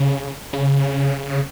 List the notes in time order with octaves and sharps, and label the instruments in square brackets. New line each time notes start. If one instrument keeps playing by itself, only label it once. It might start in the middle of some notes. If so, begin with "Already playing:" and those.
Already playing: [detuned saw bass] C#3
C#3